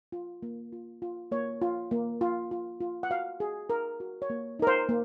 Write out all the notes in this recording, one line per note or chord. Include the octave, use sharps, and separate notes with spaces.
F4
A#3
F4
F4
A#3 C#5
F4
A#3
F4
F4
F4
F#5
F#4 F5
F#4 G#4
D#4 A#4
F#4
C#5
A#3
D#4 A#4
C5
A#3